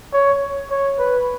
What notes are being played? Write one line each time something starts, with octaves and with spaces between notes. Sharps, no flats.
C#5
C#5
B4